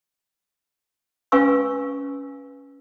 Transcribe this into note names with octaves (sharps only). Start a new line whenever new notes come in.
C#4 B4 F5 G#5 C#6 E6